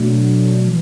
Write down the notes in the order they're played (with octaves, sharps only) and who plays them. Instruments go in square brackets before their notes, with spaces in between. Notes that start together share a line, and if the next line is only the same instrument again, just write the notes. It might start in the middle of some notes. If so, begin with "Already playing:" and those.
Already playing: [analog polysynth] B2 F#3 A3 D4
E3